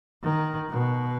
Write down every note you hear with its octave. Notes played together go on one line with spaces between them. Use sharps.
D#3
B2